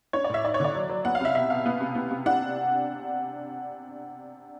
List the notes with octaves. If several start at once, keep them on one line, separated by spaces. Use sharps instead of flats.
D4 C#5
D5
A2 E5
D#4 D5
C#5
D3 D5
F#3
F#3
B3 F#5
F5
C3 E5
B2 E5
B2 F5
B3
C3
B3
C3
D4 F#5